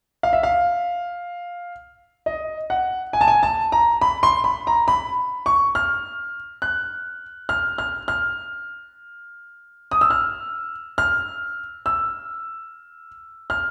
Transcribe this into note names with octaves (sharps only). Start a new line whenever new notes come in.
F5
E5
F5
D#5
F#5
G#5
A5
G#5
A5
A#5
B5
C6
B5
A#5
B5
C#6
F6
F#6
F6
F6
F6
D#6
E6
F6
F6
E6
F6